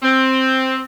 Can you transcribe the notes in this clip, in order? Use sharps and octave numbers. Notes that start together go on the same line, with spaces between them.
C4